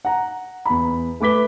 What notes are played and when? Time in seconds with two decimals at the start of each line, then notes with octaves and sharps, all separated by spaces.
0.05 F#5 A#5
0.65 E2 B5
1.20 A3 B4 D6 B6 G7